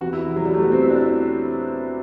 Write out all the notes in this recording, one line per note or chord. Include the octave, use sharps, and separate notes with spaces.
E2 C3 E3 F#4
E4
F#3
G3
A3
B3
C4
E4
D4